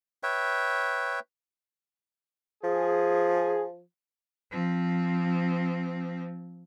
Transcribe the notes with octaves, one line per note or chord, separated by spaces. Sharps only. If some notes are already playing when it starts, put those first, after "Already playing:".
B4 C#5 E5 G5
F3 G#4
F3 C4